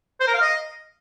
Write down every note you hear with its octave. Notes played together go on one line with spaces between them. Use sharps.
C5
A#4
F5
D#5